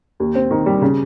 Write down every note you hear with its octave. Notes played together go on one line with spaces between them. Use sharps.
D#2
C4
D#3
G3
C#3